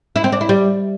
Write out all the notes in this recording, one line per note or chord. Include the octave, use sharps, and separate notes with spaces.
E4
C4
D4
E4
G3